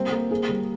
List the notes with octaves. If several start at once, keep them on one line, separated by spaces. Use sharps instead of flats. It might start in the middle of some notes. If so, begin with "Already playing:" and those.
Already playing: G3 A#3 C4
A#3
G#4
G3